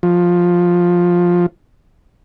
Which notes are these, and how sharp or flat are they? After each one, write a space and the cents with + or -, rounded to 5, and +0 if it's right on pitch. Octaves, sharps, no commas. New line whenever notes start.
F3 +10